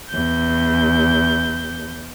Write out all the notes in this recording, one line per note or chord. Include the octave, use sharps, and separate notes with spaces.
E2 G6